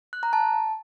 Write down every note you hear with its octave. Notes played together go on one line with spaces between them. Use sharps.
F#6
A#5
A5